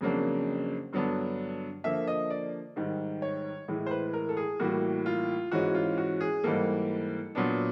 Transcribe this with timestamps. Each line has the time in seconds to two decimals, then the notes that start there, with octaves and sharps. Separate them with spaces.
0.01 F2 C#3 F#3 A#3 D4
0.93 G2 D3 F#3 B3 D4
1.84 D3 F3 A#3 E5
2.07 D#5
2.30 D5
2.76 G#2 D#3 G3
3.22 C#5
3.68 A2 E3 G#3
3.87 C5
3.91 B4
4.14 A#4
4.29 A4
4.37 G#4
4.60 A2 E3 G3 A#3 F#4
5.06 F4
5.51 G#2 E3 G#3 C#4 F#4
5.75 F4
5.98 F#4
6.21 G#4
6.44 G#2 E3 G3 A#3 A4
7.35 A#2 F#3 B3 D4